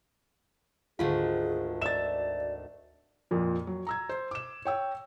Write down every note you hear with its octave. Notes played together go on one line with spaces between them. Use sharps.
G#1 D2 F4 G#4 B5
D5 E5 A6 E7
F2 A#2 F3
F#3
A#5 E6 G#6
C5
D6 E7
C#5 G5 E6